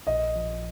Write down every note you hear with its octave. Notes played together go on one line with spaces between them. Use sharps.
A#1 D#5
F3